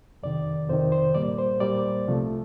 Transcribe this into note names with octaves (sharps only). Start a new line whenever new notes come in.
F2 C3 D#3 D5
F2 C3 D#3 C5
C5
A#2 G3 A#3 D5
C5
A#2 G3 A#3 D5
C2 C3 F3 A3